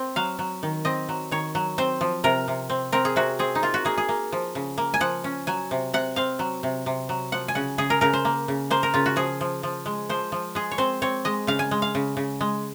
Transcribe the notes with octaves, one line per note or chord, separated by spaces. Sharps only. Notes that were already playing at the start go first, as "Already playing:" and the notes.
Already playing: C4
F#3 F5
F#3
D#3
C4 D#5
F#3
D#3 C#5
F#3
C4 C5
F3
C3 A#4
C3
C4
C4 A#4
G#4
C3 F#4
C4 G#4
D#4
A#3 F4
F#4
A#3 G#4
G#4
A#3
F3
C#3
A#3
G#5
F3 F#5
C#4
F#3 G#5
C3
C3 F#5
C4 F5
F#3
C3
C3
F#3
F3 F#5
G#5
C#3 F#5
C#3 G#4
A#4
C#3 A#4
C5
A#3
C#3
A#3 C5
A#4
C#3 F4
F#4
F3 G#4
F3
F3
G#3
F3 C5
F3
G#3 G#4
C#5
C4 C5
C4 C#5
G#3 D#5
C#3 F5
G#5
G#3
F5
C#3
C#3
G#3